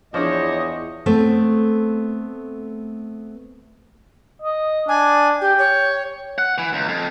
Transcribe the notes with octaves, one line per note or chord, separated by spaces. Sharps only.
E2 F3 D4 C#5 D#5 D6
A3 B3 C4
D#5
D4 G#5
G4 G5
C#5
F#5
E3
C#2
F2